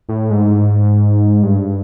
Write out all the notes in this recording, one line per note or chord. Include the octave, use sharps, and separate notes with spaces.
A2
G#2
G2